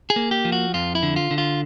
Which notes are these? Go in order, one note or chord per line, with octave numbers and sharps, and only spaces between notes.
G#4
A#3
G4
F3
F#4
F2 F4
E4
D3
F4
D3
F4